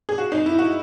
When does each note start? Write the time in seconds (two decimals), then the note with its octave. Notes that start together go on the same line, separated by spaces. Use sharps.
0.09 G#4
0.18 F#4
0.32 D#4
0.46 E4
0.59 F#4